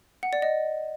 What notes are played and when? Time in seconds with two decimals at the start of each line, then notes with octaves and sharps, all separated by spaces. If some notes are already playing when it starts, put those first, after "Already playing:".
0.23 F#5
0.33 D5
0.42 D#5